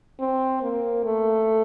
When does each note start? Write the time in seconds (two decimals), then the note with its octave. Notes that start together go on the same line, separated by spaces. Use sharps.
0.20 C4
0.62 A#3
1.04 A3